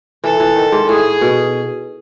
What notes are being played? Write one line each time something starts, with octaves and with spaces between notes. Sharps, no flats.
E3 A4
E3
D#3
G#2
A2 G#4
B2